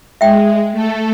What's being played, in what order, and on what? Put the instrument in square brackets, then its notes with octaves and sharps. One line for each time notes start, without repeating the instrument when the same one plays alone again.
[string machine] G#3 [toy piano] E5 G5
[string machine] A3 A4